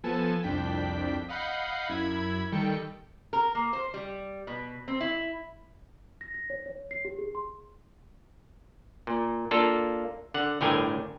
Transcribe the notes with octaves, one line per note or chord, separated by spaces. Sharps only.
F3 B3 A4 G#5 A5 E7
C2 F2 D4 G5 B6
D#5 F5 F#5 B5 G6 C7
F#2 E4 B5 G#6
D#3 G3 A4 G5 C#7
A#4
A#3
C5
G3
B2
C4
E4
A#6
A#6
C#5
C#5
C7
G4
G#4
C6
A#2
A#3 D4 F4 A4
D3 F#5
G1 A2 D3 A#4 G5 G#5